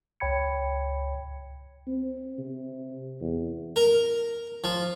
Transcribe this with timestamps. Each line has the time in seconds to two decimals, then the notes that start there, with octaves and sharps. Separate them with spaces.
0.20 C#2 C#5 G5 B5 G#6 C#7
1.87 C4
2.38 C3
3.21 E2
3.76 A#4
4.64 F3